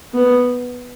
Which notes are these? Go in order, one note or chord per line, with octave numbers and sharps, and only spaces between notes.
B3